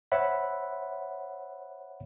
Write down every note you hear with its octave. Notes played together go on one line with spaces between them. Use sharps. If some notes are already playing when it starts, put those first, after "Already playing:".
C5 C#5 E5 F#5 B5